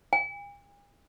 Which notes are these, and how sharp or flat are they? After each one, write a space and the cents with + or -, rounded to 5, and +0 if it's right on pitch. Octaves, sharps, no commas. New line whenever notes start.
G#5 -45